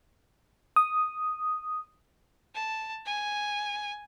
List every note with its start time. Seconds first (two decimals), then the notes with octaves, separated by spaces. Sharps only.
0.76 D#6
2.55 A5
3.06 G#5